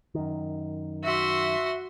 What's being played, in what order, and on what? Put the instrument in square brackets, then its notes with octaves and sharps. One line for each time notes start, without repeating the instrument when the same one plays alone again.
[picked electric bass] F#2 D#3
[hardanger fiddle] F#4 C6 [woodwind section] E5